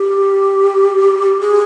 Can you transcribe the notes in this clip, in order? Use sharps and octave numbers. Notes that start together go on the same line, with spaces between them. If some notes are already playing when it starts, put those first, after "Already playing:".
Already playing: G4
G#4